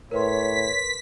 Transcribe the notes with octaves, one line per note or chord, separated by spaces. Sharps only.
A2 A#4 B4 C#5 C6 B6